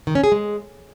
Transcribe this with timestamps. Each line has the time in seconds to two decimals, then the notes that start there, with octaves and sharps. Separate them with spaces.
0.07 D#3
0.15 C#4
0.24 G#4
0.32 G#3